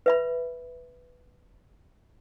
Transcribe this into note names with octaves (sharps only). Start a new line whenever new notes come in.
B4 E5 B5